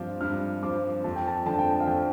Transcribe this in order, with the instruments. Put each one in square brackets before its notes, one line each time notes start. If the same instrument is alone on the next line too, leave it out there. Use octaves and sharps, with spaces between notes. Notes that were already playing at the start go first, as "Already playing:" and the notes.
Already playing: [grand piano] G2 F3 C4 F4 [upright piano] D6
[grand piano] G2 [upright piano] F6
[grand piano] F3 C4 F4 [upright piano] D6
[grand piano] F2 [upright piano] A5
[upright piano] G5
A5
[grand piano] D3 F3 C4 [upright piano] A5
[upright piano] G5
A5
F5
[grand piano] F2 [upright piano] G5